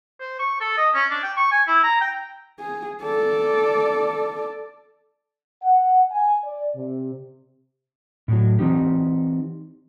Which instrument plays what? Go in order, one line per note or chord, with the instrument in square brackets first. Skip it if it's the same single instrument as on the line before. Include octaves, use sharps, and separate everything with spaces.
[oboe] C5
C#6
A4
D#5
C#4
D4
G5
C#6
G#5
E4
A#5
G5
[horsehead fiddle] G#4
A4 D5
[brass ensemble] F#5
G#5
D5
C3
[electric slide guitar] A2 F#3
E3 C4 D#4 G4